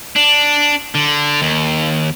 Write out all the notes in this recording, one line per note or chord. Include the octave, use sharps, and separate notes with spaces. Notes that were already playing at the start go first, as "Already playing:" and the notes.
D4
D3
D#2